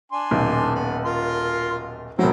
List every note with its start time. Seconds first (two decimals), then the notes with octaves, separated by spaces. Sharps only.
0.12 D4 G#5 C6
0.31 D#1 B1
0.75 B3
1.05 F4 A#4 C6
2.19 E1 F#3 C4 E4